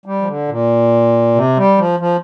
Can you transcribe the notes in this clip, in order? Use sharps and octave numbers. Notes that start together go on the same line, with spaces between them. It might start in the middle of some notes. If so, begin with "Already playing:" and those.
G3
F3
D3
A#2
C3
G3
F3
F3